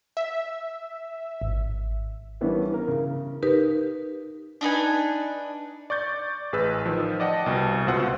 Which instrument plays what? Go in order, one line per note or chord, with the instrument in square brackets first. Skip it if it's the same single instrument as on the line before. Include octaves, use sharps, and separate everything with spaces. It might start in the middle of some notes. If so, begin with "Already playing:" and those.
[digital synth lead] E5
[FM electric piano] G#1
[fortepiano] D#3 E3 G3 B3 C#4 D4
A#4
C#3
[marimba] D#4 G4 A#4 B4
[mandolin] D4 D#4 B4 G#5
[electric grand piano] D5 C#6 G6 A6
A1 G#4 B4 E6
D#3 F3
D5 D#5 F#5 G5 A5
C2 B2 A5
C#2 B2 F4 C5 F#5 E6